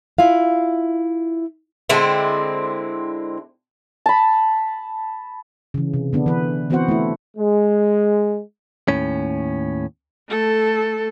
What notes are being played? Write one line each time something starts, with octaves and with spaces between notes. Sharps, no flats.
E4 F4 F5
D3 G#3 C4 E4
A5 B5
C#3 E3
C3
D3 B3 D4
E3 B4
E3 B3 C4 F#4 C5 F#5
A3 E4
G#3
D#2 A2 C#4
A3 A4